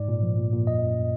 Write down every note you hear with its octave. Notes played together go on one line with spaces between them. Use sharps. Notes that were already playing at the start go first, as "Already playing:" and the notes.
Already playing: G#2 D5
A#2
F3
A#2
A#2
F#2 D#5
F#2